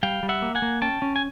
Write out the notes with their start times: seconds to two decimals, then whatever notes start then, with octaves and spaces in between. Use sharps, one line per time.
0.03 G3 F5 G5
0.23 G3
0.29 E5 F#5
0.42 A#3
0.55 F#5 G#5
0.62 A#3
0.82 C#4 G5 A5
1.02 C#4
1.16 G#5